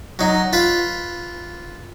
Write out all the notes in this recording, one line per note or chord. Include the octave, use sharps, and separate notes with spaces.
F#3 D#4
F4 B4